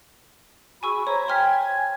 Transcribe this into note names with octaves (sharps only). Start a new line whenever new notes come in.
F#4 G#4 G#5 B5 C#6 E6
C5 C#5 E5 A#5
G4 G5 G#5 C6 F6 G#6 B6